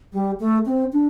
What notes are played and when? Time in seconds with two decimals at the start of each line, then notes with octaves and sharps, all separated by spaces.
0.13 G3
0.40 A3
0.66 C4
0.93 D4